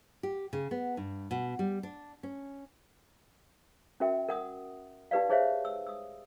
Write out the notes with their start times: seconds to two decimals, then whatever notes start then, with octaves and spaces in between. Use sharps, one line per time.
0.23 G4
0.53 C#3
0.71 B3
0.97 G2
1.31 B2
1.59 G3
1.83 D4
2.23 C#4
4.00 C#4 F#4 A#4 E5 G5
4.29 A#4 F#5 D#6
5.11 D#4 G4 B4 D5 F5
5.29 D#4 G#4 C5 C#5 E5 F5
5.65 E6
5.87 D#6 E6